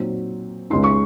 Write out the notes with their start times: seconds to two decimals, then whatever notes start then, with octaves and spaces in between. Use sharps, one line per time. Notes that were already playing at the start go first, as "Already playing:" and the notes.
Already playing: A#2 F#3 C4 D#4
0.70 C#2 C#3 G#3 D#4 C6
0.84 C#6